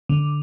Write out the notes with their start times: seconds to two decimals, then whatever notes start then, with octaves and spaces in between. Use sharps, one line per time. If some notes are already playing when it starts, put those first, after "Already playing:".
0.09 D3